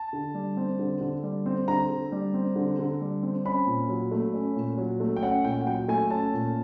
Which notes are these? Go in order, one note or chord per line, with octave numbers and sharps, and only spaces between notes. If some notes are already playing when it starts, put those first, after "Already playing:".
Already playing: A5
D3
G3
C4
D3
D3
G3
C4
D3 A#5
D3
G3
C4
D3
D3
G3
C4
C#4 B5
A#2
F#3
A3
C#4
A#2
F#3
A3
G5
C#4 F#5
A#2 G5
F#5
F#3 G5
A3 G#5
C#4 A5
A#2